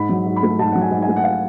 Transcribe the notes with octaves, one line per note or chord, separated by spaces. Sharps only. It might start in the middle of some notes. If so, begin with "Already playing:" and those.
Already playing: G#2 B5
F#3
G#2
B5
A3
G#2 A5
F#3 F#5
G#5
G#2
G#5
A3
F#5
F5